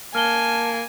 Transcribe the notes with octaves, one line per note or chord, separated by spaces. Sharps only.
A#3 G#5 A5 F6 G7